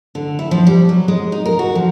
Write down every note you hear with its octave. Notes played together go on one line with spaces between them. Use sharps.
D3
E4
F3
G3
F#3
G#3
D#4
A#4
F#4
F3